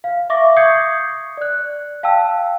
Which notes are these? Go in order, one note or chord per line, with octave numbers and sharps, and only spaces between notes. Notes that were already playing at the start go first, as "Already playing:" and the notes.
F5
E5 C#6 D6 A#6
C#6 D#6 G6 G#6 C7 C#7
D5 F#6
F5 G5 A5 E6